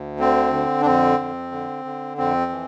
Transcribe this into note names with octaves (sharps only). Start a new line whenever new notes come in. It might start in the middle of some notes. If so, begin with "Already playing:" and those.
Already playing: D2
D3 C4
D3
D4
F2 C4
F2
D3
D3
F2 C4
E3